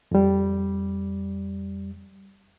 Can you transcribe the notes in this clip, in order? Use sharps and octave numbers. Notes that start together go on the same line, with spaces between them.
F2 G3